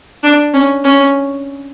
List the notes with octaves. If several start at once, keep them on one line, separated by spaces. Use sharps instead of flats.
D4
C#4
C#4